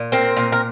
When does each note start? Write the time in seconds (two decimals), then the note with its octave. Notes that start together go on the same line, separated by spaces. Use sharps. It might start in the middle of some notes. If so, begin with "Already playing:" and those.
Already playing: A#2
0.12 C4 A#4
0.37 A#2
0.52 A#4